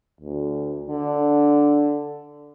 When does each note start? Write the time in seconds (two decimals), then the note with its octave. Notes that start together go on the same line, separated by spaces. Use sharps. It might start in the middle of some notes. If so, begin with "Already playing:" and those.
0.21 D2
0.90 D3 D4